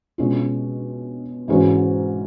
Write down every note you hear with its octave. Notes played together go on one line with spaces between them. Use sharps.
B2 G#3 C#4 F4
G#2 E3 G#3 C#4 F#4